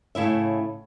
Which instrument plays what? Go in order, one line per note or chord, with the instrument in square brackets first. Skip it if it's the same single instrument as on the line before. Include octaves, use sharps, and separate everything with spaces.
[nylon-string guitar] A2 C#3 E4 E5